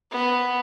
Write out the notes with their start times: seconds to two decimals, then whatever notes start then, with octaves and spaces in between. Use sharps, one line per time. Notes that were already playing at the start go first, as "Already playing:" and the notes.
0.11 B3